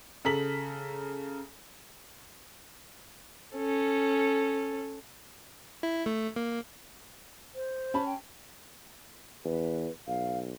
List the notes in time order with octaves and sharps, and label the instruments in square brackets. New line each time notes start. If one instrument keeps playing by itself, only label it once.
[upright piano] C#3 A4 A#5 B6 F#7
[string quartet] C#4 A4
[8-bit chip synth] E4
A3
A#3
[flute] C5
[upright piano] C#4 A5 B5
[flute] G5
[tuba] E2 [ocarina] B4
[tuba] B1 [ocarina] F5